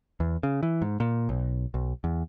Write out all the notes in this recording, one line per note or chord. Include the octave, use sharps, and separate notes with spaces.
E2
C#3
E3
G#2
A#2
B1
B1
E2